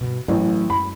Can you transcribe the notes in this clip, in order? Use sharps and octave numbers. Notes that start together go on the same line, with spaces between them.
G2 B2
A1 F#3
F#2 G#3 B5